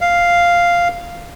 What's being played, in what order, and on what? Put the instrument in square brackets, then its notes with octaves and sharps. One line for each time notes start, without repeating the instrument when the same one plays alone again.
[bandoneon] F5